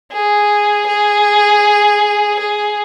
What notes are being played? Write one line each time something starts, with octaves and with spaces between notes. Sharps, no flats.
G#4
G#4
G#4